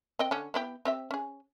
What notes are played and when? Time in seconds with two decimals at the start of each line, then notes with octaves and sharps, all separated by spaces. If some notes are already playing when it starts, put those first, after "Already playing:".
0.19 C4 D#5 G5
0.31 D3 C#4
0.54 B3 E4 G4
0.85 C4 G4 E5
1.11 C#4 G#4